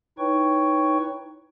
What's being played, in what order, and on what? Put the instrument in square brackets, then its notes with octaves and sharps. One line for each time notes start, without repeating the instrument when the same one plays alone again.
[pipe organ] D#4 E4 B4 C#5 G5 C#6